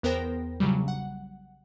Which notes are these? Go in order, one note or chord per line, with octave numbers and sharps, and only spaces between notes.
E2 B3 A#4 C5 G5 A#6
A#1 C#3 F#3 G3
F#5